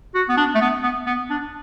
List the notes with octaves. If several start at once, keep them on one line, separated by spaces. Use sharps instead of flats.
F#4
B3
D4
A3
B3
B3
B3
D4